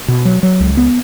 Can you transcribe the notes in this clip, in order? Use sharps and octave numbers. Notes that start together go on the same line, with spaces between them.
B2
F#3
F#3
C#2
B3